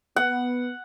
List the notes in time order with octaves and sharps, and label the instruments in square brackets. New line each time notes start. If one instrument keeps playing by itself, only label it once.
[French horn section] B3 [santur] F#5